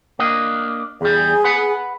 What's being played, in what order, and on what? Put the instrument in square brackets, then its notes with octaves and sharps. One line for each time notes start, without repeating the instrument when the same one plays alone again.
[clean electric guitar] A#3 D4 D#5
[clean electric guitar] E2 G3 [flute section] G#4
[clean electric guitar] B4 F#5